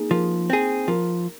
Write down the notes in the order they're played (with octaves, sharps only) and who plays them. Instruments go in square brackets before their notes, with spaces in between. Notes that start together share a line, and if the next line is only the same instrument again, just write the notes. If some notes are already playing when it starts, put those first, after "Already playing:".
Already playing: [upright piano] A#3 D#4 G#4
[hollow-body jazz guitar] F3 [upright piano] A#4
[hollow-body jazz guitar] C4 G#4
[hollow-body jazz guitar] F3 [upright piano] A#4